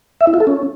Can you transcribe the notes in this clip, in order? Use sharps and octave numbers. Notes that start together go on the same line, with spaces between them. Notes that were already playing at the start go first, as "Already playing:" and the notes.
E5
E4
F4
A4
C#4